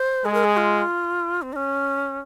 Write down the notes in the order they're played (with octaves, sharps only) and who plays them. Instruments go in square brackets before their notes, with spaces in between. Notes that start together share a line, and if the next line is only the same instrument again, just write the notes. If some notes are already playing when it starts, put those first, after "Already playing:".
Already playing: [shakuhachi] C5
[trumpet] G#3 [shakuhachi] G#4
[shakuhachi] A#4
G#4
F4
C4
D#4
C#4